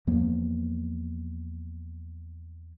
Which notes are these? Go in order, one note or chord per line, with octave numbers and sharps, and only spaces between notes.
E2 F3 A#3